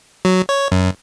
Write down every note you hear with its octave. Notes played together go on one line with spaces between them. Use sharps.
F#3
C#5
F#2